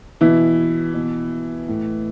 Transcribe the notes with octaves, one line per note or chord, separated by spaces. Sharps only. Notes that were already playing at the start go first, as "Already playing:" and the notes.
B2 E3 E4
B2
A2